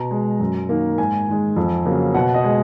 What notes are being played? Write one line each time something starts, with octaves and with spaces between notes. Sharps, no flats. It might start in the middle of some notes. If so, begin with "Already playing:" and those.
Already playing: B2 A#5
G#3
F#2
D#3 A#3
G#2 G#5
D#3 G#3
F2
C#3 F#3 A#3
B2 F#5
D#5
G#3